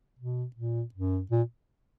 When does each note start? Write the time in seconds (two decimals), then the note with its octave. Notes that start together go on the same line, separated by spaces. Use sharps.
0.19 B2
0.56 A#2
0.94 F#2
1.31 A#2